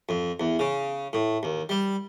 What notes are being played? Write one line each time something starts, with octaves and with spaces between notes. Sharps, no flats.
F2
E2
C#3
A2
D#2
G3